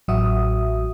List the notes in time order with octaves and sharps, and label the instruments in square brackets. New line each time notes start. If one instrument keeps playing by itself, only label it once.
[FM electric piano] A1 F#3 F#4 E5 D#6